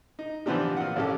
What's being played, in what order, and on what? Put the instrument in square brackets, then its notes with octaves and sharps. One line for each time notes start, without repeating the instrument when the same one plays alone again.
[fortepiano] D#4
E3 F3 B3 C4 D4 G4
A#2 F#5
A1 C#4 G4 A4